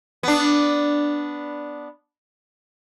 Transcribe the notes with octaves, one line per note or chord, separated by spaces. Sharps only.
B3 D4